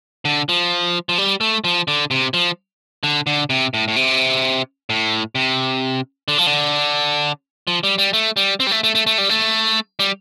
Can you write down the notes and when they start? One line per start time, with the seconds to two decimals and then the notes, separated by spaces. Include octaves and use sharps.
0.25 D3
0.49 F3
1.09 F3
1.18 G3
1.41 A3
1.64 F3
1.88 D3
2.11 C3
2.34 F3
3.03 D3
3.27 D3
3.50 C3
3.74 A2
3.88 A2
3.96 C3
4.90 A2
5.35 C3
6.28 D3
6.38 F3
6.47 D3
7.67 F3
7.83 G3
7.98 G3
8.13 A3
8.37 G3
8.60 C4
8.67 G3
8.71 A3
8.84 A3
8.95 A3
9.07 A3
9.18 G3
9.29 A3
9.99 G3